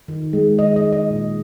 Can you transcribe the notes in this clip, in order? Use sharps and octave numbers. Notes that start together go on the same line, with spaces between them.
D#3
G#3
D#3 D#5
D#5
G#3
D#5
A#2